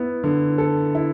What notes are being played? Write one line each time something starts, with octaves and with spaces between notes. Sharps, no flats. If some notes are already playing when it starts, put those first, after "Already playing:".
Already playing: B3 E4
D3
A4
E4